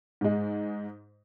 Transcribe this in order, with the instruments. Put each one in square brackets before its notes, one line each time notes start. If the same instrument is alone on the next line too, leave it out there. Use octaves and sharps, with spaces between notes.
[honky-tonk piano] G#2 G#3